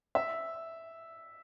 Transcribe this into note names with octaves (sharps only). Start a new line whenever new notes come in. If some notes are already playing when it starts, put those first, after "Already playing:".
E5